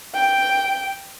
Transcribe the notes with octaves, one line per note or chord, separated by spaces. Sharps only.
G5